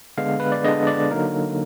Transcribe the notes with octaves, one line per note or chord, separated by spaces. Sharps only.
D3 G#3 B3 D4 F5
B4
D5
D3 G#3 B3 D4 D#5
D5
D3 F#3 A#3 D#4 A#4